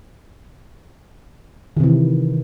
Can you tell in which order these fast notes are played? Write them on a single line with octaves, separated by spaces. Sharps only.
D#3 C3 E3